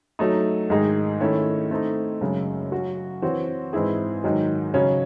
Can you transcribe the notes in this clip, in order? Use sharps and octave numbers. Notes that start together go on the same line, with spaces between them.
F#3 A3 D#4
G#2 D#3 G#3 D#4 G#4
D#3 A3 C#4 E4
A3 C4 D#4
F#2 C#3 G#3
F#3 C#4 F#4
E3 C4 F#4 C#5
G#2 E3 C4 E4 G#4
G#2 D#3 F#3
C#3 F#3 C#4